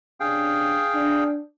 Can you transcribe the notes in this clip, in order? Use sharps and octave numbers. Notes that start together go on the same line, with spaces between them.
C3 C#4 D4 G#4 F5 G5
D4